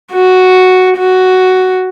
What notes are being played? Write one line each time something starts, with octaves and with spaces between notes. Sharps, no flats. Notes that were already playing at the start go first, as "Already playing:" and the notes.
F#4
F#4